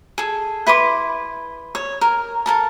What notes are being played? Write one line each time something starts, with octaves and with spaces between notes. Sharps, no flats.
G#4 A4
E4 B4 C6 D6
C#5
A#4
A4 A#4 A5